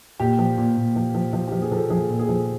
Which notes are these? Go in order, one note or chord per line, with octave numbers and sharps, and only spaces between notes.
A#2 G4
F3
A#2
A#2
F3
F3
F3
G4
F3
G#4
F3 A4
F3 G#4
A#2
G#4
F3